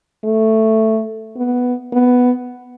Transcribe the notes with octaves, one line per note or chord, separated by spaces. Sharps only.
A3
B3
B3